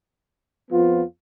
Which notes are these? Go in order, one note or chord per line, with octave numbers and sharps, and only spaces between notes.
F2 F3 B3 F4